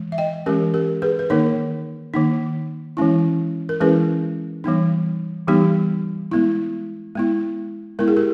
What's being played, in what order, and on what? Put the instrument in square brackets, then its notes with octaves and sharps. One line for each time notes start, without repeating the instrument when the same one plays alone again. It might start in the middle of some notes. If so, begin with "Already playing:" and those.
Already playing: [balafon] E3 G#3
E5
D#5 G5
E3 G#3 C#4 G4 A#4
G4 A#4
G#4 B4
B4
D#3 A#3 D#4 A#4 C#5
D#3 A#3 D#4
E3 G#3 C#4 E4
A#4
E3 G#3 C#4 E4 G#4 B4
E3 G3 B3 D#4
E3 G3 B3 D#4 G4
G#3 B3 E4
G#3 B3 E4
G#3 B3 E4 A#4
G#4
G4 A#4